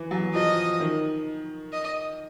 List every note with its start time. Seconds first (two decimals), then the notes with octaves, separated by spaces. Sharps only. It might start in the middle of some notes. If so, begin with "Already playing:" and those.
Already playing: E3
0.11 F#3
0.34 F3 D#5
0.80 D#3
1.72 D#5